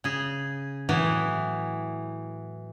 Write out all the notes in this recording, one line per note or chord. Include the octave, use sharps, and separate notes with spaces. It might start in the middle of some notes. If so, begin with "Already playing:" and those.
C#3 G#4
A2 E3 F#3 B3